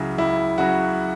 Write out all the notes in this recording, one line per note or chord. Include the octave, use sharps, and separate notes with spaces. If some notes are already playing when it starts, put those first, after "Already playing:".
Already playing: C#2 C#3 F#3 E4
C#2 E4
C#3 F#3 F#4